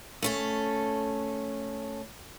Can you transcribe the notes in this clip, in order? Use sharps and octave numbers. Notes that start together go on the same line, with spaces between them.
A3 C#4 A4